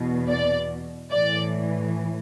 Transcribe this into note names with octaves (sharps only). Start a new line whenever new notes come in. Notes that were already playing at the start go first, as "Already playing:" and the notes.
Already playing: E2 B2
D5
A2 E3 D5